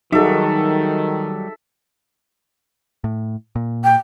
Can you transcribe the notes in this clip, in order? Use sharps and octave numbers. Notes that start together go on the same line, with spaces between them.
D#3 F#3 G3 D#4 F#4 G#4 A4 E5
A2
A#2
G5